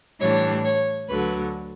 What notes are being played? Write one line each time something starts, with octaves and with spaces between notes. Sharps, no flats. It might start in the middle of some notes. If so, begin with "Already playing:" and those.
A2 E3 G3 D4 C#5
C#5
D2 D3 F#3 B4